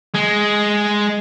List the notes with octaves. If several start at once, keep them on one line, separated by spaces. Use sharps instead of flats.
G#3